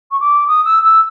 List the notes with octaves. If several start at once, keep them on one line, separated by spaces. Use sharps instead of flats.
C#6
D6
D#6
E6
E6